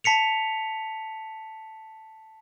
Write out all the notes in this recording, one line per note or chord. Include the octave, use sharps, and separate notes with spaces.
A5 B6 C#7 F7